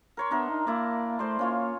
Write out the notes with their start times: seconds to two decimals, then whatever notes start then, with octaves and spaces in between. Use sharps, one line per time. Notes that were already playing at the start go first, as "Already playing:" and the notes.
0.17 A#4 C#5 C6
0.31 B3 D4 A#4 E5
0.49 D#4
0.67 A#3 E4 D5
1.19 A3 C5 D5 C6
1.39 A#3 C#4 F4 C#5